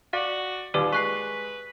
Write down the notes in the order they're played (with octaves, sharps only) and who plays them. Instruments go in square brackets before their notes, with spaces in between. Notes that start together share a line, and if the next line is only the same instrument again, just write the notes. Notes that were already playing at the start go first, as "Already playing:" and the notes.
[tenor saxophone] F#4 [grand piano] D5 [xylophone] F5
[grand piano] D#1 D#2 D6 [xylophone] G4 B4 D5
[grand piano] G#3 [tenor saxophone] B4 [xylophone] C#6 F#6 C7